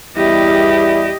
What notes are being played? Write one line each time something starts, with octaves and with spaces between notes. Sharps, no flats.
E2 G3 E4 G4 D#5